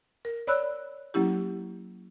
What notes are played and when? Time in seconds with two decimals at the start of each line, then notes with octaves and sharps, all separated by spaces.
0.25 A#4
0.47 C#5 D5 B5 E6 F#6
1.14 F#3 A#3 C#4 E4 G4